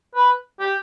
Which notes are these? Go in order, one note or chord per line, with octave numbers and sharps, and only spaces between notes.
B4
G4